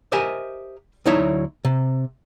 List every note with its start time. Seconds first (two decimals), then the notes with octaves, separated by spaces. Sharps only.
0.12 G4 A#4 C5 D#5 E5 G#5
1.06 D2 F#3 D#4 E4 C#5 E5
1.65 C3